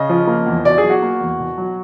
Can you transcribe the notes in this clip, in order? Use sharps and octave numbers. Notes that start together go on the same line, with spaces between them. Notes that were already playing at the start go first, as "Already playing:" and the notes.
Already playing: C#3 D#5
F3
A#3
E2
B2 D5
G#4
F#3
F#4
A#3
E2
B2
F#3